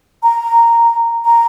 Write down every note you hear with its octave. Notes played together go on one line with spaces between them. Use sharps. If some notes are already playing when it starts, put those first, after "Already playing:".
A#5
A#5